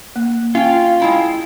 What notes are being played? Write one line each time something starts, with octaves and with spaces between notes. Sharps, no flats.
A#3
C#4 F4 G5
G#3 E4 G5